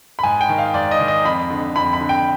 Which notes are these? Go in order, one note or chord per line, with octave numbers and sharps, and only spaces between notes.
B5
G#2 G#5
G5
D#3
F5
G#2 D5
D#5
D#3
D#5
F2 B5
D3
F2 B5
B5
D3
G5